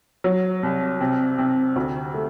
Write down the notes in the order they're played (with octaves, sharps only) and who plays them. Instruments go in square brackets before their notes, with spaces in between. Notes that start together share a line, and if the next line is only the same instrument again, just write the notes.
[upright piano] F#3
C2
C3
C3
D2
A3